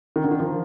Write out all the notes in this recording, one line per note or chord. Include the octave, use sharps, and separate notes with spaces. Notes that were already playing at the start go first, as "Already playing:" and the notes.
D#3
D3
D#3
F3